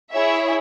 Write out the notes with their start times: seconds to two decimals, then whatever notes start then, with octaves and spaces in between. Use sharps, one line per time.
0.11 E4 G#4 C#5 E5